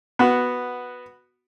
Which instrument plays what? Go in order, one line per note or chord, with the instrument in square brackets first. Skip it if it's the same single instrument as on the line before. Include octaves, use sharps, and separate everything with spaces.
[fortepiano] B3 F#4